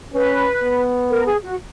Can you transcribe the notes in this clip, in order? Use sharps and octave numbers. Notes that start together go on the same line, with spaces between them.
C#4 B4
B3
A#4
G#4
F#4